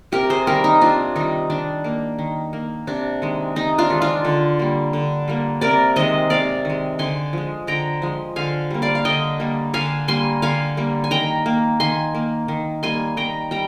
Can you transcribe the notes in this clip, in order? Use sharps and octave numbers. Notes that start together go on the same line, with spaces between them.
C3 G4 A#4
G#4 C5
D#3 G3 G4 A#4
D#4
C3 D4 F4
D#3 G3 D#4
D#3 D4
A#3
D#3
A#3
C3 D4
D#3 G#3
C3 D#4
D4 F4
D#3 G#3
D4 F4
D3
G3 A#3
D3
G3 A#3
C3 A#4 D5
D#3 G#3 C5 D#5
C3 D5 F5
D#3 G#3
D3 G#5 C6
F3 G#3
D3 G5 A#5
F3 G#3
D3 F5 G#5
G3 A#3
D5 F5
F5
D3 D#5 G5
G3 A#3
D3 F5 G#5
G3 A#3 G#5 C6
D3 F5 G#5
G3 A#3
G#5
D#3 G5 A#5
A#3
D#3 G#5 C6
A#3
D#3
G3 A#3 G#5 C6
D#3 G5 A#5
G3 G5 A#5